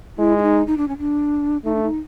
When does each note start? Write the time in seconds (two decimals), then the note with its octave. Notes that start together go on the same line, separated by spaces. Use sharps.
0.18 G#3 E4
0.38 E4
0.42 D#4
0.67 D#4
0.77 D4
0.88 C#4
0.98 D4
1.65 A3 D#4
1.75 D4
1.83 D#4